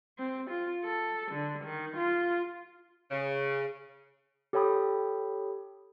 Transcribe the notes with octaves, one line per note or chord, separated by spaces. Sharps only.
C4
F4
A4
D3
D#3
F4
C#3
G4 A4 C#5 G5 B5 D#6